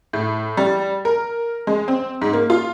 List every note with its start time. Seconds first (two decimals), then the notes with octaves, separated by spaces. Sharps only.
0.13 A2
0.57 G3
1.05 A#4
1.67 G#3
1.88 C4
2.22 G#2
2.33 A#3
2.50 F4